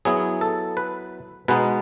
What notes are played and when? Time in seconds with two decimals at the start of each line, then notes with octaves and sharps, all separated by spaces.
0.05 F#3 B3 E4 G#4
0.41 A4
0.77 B4
1.48 B2 G#3 B3 D#4 B4